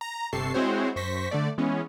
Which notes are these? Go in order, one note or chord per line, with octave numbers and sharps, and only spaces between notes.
A#5
G1 C3 A4 A5 C#6 C7
G#3 C4 E4 F#4 C5 C#5
F#2 C5 C#6 A#6 B6
D3 A3 D5
E3 G#3 B3 C#4